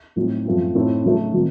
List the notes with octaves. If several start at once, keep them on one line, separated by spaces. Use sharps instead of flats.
A2 F#3 A3 C4 D#4
F#2 F3 A3 C4 F4
A2 A3 C4 D#4
C#3 F#3 A3 D#4
D#3 F#3 C4